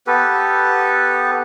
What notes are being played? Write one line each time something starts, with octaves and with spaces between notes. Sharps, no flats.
B3 G4 A4 B4